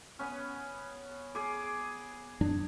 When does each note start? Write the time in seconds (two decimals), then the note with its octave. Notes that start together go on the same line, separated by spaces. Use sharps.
0.19 B3 C#4
1.35 G#4 D6
2.41 F#2 F#3 D4